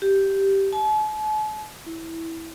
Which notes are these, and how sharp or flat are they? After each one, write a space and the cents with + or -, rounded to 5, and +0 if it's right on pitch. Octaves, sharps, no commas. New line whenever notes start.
G4 -5
A5 -45
E4 -10